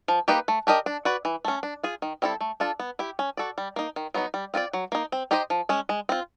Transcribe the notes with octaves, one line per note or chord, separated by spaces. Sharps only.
F3
A#3 D#4 G4 B4
A3
D4 G4 A#4 D#5
D4
F#4 B4 D5
E3
A3 C#4
D4
F4 G#4
D#3
G3 C4 E4 A4
A3
D4 F4 A4
B3
E4 G4
C#4
F#4 A4 D5
G3
A#3 D#4
D#3
F#3 B3 D#4
G3
C4 F4 A#4 D5
F#3
A#3 D#4
C4
D#4 G4 C5 D#5
F3
G#3 C#4
G#3
C4 F4